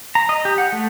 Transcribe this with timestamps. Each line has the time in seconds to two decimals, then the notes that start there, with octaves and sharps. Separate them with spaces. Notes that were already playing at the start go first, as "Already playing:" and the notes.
0.15 A#5
0.29 D#5
0.45 G4
0.58 F#5
0.72 A3